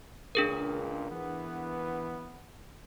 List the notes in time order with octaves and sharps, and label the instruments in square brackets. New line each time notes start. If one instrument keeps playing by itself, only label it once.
[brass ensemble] C#2 A#2 [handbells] D4 G#4 A#4
[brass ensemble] E3 B3